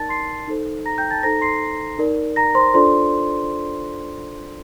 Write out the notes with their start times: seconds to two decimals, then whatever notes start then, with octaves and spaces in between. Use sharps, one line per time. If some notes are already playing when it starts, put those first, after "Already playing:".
Already playing: D#4 A#4 D5 A5 A6
0.09 C6 C7
0.48 D#4 A4 C5
0.85 A#5 A#6
0.98 G5 G6
1.11 A5 A6
1.23 D#4 A4 C5 A#5 A#6
1.41 C6 C7
1.99 D#4 A#4 D5
2.36 A#5 A#6
2.55 C5 C6
2.74 D4 F4 A4 C5 D5 C6